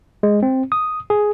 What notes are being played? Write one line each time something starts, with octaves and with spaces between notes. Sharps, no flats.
G#3
C4
D#6
G#4